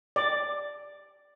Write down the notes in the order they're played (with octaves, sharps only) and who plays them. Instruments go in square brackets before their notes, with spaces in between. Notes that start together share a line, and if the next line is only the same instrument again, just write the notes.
[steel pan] D5